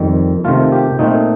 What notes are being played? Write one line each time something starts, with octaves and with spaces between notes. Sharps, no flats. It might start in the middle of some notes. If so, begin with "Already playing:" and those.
Already playing: F2 D#3 G3
C3 D#3 A3 F4
G4
A#2 A3 C4 D#4